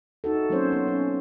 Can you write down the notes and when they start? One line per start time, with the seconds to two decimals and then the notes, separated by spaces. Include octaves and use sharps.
0.24 D#4 F#4 A4
0.50 F#3 A#3 C4 C#4 C5 C#5
0.72 B3
0.88 C#4